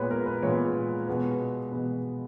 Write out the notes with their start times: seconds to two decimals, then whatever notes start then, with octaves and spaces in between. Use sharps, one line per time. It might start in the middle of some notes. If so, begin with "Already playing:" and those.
Already playing: A#2 G#3 B3 B4 C#5
0.11 A#4
0.26 B4
0.43 A#2 G#3 B3 C#5
1.07 B2 G#3 B3 B4
1.72 B2 G#3 B3